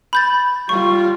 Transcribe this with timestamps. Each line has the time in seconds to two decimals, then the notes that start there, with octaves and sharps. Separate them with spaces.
0.13 B5 G6 A6
0.69 G3 F4 C#6